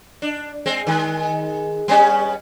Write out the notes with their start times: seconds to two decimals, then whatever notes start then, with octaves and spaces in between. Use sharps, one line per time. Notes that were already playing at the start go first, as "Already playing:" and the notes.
0.22 D4
0.66 G#3 C4
0.87 D#3 G#3
1.88 G3 B3 C#4